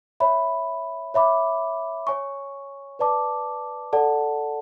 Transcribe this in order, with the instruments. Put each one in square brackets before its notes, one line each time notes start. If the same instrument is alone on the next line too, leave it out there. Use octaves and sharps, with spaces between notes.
[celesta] C#5 E5 B5
C#5 E5 B5 D6
C#5 G#5 C#6
B4 D5 A5 D6
A4 D5 F#5 A5